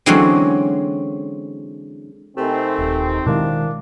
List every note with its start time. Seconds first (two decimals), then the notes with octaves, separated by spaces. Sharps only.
0.06 D3 E3 F#3 G#3 C4 C#4
2.37 C3 A3 C4 D#4 G4 A#4 G#5
2.79 D#1
3.26 B2 D#3 G#3 D4 E4 A#4 F5